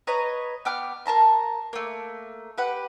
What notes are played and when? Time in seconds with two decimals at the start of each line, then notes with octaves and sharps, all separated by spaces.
0.07 B4 C#5 D#5 A#5
0.65 B3 G5 D6 F6
1.06 A#4 A5 A#5 C6
1.73 A3 A#3
2.58 G4 B4 F#5